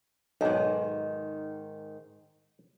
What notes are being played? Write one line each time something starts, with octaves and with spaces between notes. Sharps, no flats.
B1 G#2 D#3